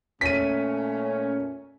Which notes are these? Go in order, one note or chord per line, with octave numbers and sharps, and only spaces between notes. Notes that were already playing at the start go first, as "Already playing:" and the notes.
A#2 A3 C#4 B6 D#7